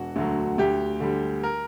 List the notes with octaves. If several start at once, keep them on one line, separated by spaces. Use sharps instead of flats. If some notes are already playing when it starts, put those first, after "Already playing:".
Already playing: E1 F#4
D2 D3 F#3
D2 G4
D3 G3
A#4